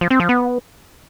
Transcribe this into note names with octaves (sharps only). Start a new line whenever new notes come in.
F3
C4
F3
B3